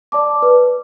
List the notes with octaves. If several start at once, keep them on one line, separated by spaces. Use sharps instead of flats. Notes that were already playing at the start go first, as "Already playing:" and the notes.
D5 A5 D6
B4